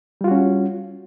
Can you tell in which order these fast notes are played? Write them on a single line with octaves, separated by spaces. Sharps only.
G3 F4 F#4 C#4